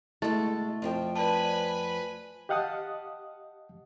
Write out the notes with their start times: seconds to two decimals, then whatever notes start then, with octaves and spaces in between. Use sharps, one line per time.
0.22 B2 G#3 A3 E4 A6
0.82 F2 F3 G5
1.16 B4 D5 G#5 A5
2.49 G4 D#5 F5 F#5 A5 D#6